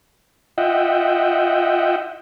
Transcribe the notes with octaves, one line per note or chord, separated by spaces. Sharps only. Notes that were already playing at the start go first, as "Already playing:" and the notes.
F4 D#5 E5 F#5 G5